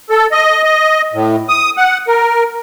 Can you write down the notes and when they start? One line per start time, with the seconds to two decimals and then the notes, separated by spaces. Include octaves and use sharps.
0.10 A4
0.32 D#5
0.63 D#5
1.14 A2
1.49 D#6
1.77 F#5
2.08 A#4